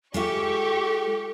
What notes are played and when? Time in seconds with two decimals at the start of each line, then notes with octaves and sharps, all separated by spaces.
0.14 G#3 F4 G4 A4 E5 C#6